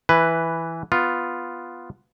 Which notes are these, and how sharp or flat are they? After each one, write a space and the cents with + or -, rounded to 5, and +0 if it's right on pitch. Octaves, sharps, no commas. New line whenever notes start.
E3 +0 B4 +0
B3 +0 F4 +0